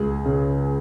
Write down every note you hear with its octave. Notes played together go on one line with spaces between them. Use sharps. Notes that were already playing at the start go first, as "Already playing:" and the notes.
Already playing: C#2 G#4
C#3